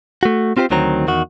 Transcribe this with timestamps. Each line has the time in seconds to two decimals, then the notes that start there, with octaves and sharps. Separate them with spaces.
0.23 A3 F#4
0.57 C4 F4 G4 B4 C5
0.70 D2 D#3 F#3 C4 A#5
1.07 E2 D#3 F#4